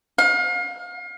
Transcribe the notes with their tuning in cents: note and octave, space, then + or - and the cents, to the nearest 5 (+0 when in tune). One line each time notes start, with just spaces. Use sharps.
F5 +35